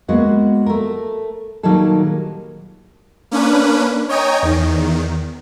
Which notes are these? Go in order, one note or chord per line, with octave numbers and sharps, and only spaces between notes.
G#3 A#3 B3 F#4 F#5
A3 A#4
A#2 D#3 F#3 G3 G#4 A4
A#3 C#4 D4 B4
C#5 D#5 G5 G#5 A#5
E2 D#3